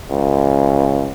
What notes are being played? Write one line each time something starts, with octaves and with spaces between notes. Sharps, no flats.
C#2